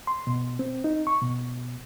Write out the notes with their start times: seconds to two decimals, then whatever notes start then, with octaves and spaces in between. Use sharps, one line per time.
0.07 C6
0.27 B2
0.59 C4
0.84 D#4
1.07 C#6
1.22 B2